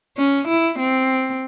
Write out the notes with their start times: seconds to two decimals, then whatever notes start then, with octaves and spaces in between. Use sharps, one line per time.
0.17 C#4
0.47 E4
0.79 C4